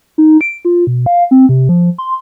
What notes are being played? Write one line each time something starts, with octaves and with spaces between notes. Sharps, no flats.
D#4
D7
F4
B2
F5
C4
C3
F3
C6